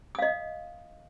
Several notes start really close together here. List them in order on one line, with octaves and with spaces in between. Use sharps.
D#6 F5 D#5